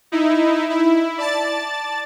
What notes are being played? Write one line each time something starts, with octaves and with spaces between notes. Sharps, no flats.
D#4 E4
E4
D5 A5 A6